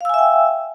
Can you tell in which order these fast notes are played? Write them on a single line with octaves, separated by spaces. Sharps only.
F5 E6 G#5 E5 G5